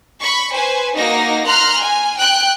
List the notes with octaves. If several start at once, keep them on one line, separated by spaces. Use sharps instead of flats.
B5 C#6
B4 C5 G#5
A#3 D#4 F#4 A#6
A#5 C6 F6 F#6
G#5
G5 F#6